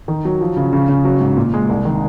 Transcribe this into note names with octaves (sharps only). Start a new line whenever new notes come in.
D#3
F#3
F3
C#3
C#3
C#3
F#3
G#2
A#2
G#3
C2
D#3